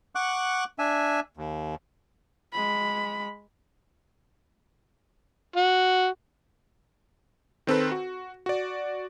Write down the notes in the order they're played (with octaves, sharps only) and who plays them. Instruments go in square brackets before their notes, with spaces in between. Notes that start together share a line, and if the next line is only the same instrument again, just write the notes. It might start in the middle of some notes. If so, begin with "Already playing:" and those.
[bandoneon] F#5 C#6 D6 F#6
D4 E5 G#5
D#2
[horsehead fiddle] G#3 B5
[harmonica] F#4
[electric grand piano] D#3 C4 A4 B4
F#4
F#4 D5